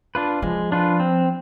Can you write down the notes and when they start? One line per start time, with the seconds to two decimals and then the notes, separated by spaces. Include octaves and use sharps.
0.15 D4 F4 B4
0.42 F3 G#3
0.72 D4 F4 B4
1.00 C4